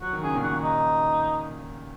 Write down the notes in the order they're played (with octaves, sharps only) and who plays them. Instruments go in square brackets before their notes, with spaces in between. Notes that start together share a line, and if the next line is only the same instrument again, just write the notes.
[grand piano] F#3 [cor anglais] F#4
[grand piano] D#3
[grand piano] C#3 [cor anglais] G#4
[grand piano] A#2 D#3
[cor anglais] F#4
D#4